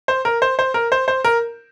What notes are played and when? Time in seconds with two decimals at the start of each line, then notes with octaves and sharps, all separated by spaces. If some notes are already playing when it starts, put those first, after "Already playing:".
0.08 C5
0.25 A#4
0.42 C5
0.59 C5
0.74 A#4
0.92 C5
1.08 C5
1.24 A#4